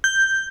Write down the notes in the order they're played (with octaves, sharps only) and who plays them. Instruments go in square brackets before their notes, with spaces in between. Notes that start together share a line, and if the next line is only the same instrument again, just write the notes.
[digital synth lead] G6